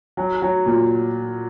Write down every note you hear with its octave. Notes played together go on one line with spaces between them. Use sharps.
F#3
F#3
A#2